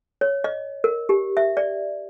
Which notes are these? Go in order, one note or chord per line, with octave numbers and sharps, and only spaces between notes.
C#5
D#5
A#4
G4
E5
D5